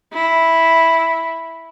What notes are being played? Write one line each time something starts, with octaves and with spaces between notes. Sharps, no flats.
E4